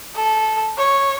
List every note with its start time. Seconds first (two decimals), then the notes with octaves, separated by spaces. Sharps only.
0.16 A4
0.78 C#5